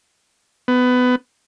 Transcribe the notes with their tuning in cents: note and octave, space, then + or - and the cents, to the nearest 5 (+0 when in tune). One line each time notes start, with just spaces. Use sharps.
B3 +20